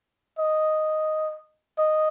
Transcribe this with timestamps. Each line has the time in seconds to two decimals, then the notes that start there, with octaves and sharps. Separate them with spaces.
0.39 D#5
1.78 D#5